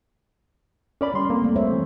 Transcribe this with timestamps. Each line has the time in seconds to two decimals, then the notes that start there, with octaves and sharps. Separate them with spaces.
1.01 C#4 A#4 D5 B5
1.13 G3 C6
1.30 A3 A#3 C4 A4
1.42 G3 A3
1.56 C5 C#5 E5
1.71 E3 C4